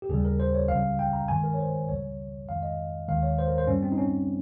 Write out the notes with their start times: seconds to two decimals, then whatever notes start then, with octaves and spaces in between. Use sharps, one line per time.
0.02 G4
0.09 D#2 C#3 G3 G#4
0.25 A#4
0.40 C5
0.55 C#5
0.68 C#2 C#3 G3 F5
0.99 G5
1.13 A#5
1.28 G2 D#3 G#3 G#5
1.44 A#4
1.54 C#5
1.59 C5
1.88 C#2 C#3 G3 C#5
2.48 F2 D#3 G#3 F5
2.63 D#5
3.08 D#2 D#3 G#3 F5
3.23 C#5
3.39 C5
3.47 A#4
3.58 C5
3.67 G2 G3 C#4
3.83 C4
3.92 D#4
3.97 C#4